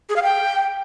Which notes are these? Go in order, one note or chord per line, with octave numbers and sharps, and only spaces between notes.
G#4
F5
G5